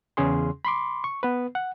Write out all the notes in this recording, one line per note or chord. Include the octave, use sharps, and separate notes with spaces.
E2 C#3 C#4 G#4 C6
B5 C6 D6
C#6
B3 B4
F#5